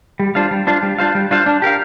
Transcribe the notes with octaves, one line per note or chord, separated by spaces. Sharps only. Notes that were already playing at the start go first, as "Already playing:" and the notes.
G3
D4 F4 C5 F5
G3
D4 F4 C5 F5
G3
D4 F4 C5 F5
G3
D4 F4 C5 F5
D4
G4 A#4 F5